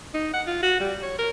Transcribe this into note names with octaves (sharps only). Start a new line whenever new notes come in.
D#4
F#5
F4
F#4
G3
C#5
A#4